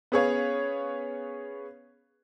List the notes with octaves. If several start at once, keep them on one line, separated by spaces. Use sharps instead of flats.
B3 C#4 G#4 B4 C#5 F5